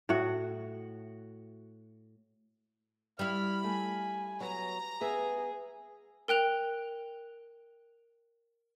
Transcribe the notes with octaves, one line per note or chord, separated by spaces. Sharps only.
A2 F#4
G3 E4 B5 F6
A3 G#5
F#3 B3 A#5
B3 G#4 B4 E5
A#4 G5 F#6 F7